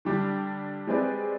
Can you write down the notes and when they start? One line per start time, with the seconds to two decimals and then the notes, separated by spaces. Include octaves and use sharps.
0.05 D3 G3 D4 G4
0.87 G#3 C4 G4 B4 D5